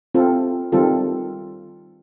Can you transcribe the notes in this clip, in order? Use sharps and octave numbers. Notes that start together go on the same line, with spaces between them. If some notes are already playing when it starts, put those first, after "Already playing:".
C4 F4 A4
D#3 G3 C4 F4 A4